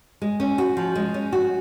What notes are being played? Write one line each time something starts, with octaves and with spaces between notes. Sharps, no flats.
G#3
C#4
F#4
F3
G#3
C#4
F#4